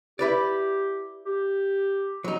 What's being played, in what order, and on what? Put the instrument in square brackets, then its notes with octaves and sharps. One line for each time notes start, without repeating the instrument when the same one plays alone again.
[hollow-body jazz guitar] E4 B4 D5 [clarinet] G4
[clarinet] G4
[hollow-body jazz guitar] F#3 D#4